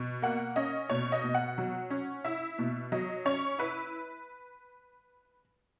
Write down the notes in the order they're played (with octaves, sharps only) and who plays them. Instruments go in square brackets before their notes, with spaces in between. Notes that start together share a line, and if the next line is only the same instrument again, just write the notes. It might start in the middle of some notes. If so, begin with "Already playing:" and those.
Already playing: [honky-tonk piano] B2
A#3 F#5
C#4 D#5
B2 C#5
D#5
B2
F#5
F#3
C#4
E4 E5
B2
F#3 D#5
C#4 C#5
E4 B4